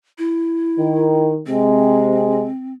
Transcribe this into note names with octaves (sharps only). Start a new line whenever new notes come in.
E4
D#3
C3 G#3 C4